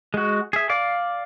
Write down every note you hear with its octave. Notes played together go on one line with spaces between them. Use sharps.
G#3 F#4
G#4 E5
D5 F5 D6